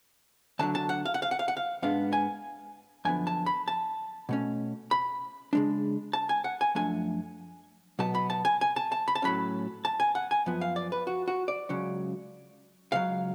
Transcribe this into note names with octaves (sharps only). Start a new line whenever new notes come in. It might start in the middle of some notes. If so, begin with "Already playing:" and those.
D2 D3 F#3 A5
A5
F#5
F5
F#5
F5
F#5
F5
F#5
F5
G#2 G#3 B3 D4 F5
G#5
F#2 D3 F3 B3 G#5
A5
B5
A5
B2 A3 C#4
B5
C#3 G#3 D4
A5
G#5
F#5
G#5
F#2 F3 A3 D4 G#5
B2 F#3 B3 A5
B5
A5
G#5
G#5
A5
A5
B5
A5
A2 F#3 C#4 B5
A5
G#5
F#5
G#5
F#2 F3 B3
F5
D5
B4
F#4
F#4
D5
C#2 C#3 F#3 C#4
C#2 C#3 F#3 F5